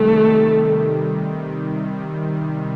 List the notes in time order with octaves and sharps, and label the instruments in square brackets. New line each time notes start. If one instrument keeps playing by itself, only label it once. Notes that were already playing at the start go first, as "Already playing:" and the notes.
Already playing: [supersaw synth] C3 D#3 G3 [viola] A3